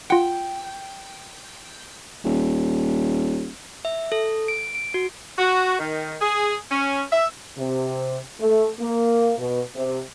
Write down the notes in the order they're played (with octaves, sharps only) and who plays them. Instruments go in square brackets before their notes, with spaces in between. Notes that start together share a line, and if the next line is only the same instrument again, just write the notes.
[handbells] F4 F#5 [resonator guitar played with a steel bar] G5
[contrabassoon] D#1
[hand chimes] E5
A4
D7
D7
F#4
[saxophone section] F#4
D#3
G#4
C#4
E5
[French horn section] C3
A3
A#3
B2
C3